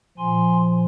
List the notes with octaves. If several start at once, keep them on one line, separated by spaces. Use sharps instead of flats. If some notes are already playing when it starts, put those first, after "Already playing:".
A#2 F3 G#5 C6